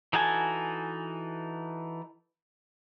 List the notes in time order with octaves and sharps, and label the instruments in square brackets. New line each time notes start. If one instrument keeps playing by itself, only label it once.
[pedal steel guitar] E3 D#4 F#4 A4 G#5